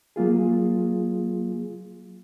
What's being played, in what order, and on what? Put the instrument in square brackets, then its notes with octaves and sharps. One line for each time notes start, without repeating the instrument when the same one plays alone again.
[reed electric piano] F#3 A#3 F4 G#4